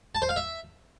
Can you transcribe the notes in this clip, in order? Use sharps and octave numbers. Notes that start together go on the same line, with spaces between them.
A5
C5
F5
E5